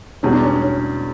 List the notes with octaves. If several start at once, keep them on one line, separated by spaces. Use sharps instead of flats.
E2 B2 G3 C#4
D4
C#4
C#4